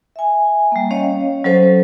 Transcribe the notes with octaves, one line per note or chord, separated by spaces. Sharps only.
E5 G#5
G3 A#3
C#4 C#5 D#5 F5
F#3 C#4 A4 C5